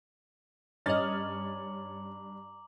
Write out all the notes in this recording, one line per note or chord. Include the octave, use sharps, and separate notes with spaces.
G2 C#4 D#5 A#5 D6 F6 A6 F#7